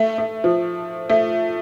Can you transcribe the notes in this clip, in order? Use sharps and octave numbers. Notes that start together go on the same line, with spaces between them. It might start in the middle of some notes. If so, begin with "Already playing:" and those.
Already playing: A3
A3
F3
A3